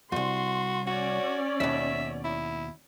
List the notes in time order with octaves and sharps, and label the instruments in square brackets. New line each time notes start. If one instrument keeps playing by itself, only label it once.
[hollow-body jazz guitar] C2 F2 [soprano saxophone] F#4 [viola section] C6
[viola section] C#4 D5 [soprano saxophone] F#4
[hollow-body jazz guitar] D#2 B2 [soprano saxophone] E5
[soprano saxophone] E4